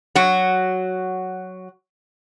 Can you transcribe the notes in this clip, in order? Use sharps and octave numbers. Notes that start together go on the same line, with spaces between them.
F#3 F#4